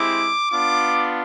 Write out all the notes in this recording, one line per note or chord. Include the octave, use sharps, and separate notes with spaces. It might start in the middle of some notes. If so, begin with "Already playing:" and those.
Already playing: G#3 C4 E4 G4 D6
B3 D4 F4 D6